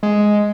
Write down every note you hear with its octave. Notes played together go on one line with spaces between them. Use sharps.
G#3